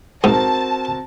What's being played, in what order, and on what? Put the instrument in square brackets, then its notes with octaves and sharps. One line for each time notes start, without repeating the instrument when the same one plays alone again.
[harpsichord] G#2 [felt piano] C4 F#4 A#4 [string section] A5